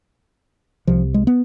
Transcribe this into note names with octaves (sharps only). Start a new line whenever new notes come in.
C2 C3 F3
G#3
B3